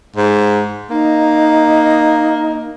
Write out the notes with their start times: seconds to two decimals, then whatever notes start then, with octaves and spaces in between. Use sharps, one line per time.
0.16 G#2
0.90 A#3 D#4